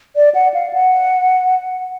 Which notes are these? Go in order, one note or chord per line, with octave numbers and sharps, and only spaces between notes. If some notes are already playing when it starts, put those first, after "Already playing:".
D5
F#5
F5
F#5